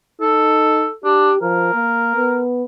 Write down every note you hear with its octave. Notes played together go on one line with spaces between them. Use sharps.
D#4 A4
D4 G4
F3 A#4
A#3
B3